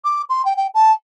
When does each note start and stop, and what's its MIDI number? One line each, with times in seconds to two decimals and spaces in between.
0.04 0.22 86
0.29 0.45 84
0.45 0.56 79
0.57 0.67 79
0.74 0.92 81